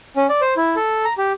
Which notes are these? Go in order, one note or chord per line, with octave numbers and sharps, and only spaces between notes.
C#4
D5
C5
E4
A4
A#5
G4